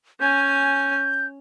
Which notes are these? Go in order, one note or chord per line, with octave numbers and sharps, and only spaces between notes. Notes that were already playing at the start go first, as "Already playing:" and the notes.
C#4 G#5 G6